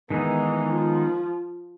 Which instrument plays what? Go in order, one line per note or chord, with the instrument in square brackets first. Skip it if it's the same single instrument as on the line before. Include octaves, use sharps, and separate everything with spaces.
[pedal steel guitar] D#3 G#3 B3 D#4 G#4 [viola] E3
[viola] F3